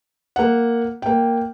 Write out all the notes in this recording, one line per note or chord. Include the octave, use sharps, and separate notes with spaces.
A#3 F#5
A#3 G5